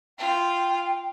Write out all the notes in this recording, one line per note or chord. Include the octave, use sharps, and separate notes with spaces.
F4 G5